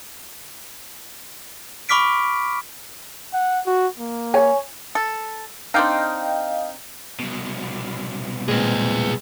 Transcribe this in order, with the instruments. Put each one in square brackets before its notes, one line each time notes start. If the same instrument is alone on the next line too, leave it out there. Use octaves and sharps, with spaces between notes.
[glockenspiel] B5 C#6 D6 F6 B6 D7
[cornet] F#5
F#4
A#3
[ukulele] C#5 G#5
[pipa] A4
[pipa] C4 D4 D#4 [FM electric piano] D#5 F5 G5
[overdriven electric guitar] C2 B2
[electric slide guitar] A#2 [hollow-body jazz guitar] G#3 C4 [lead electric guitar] G#4 B4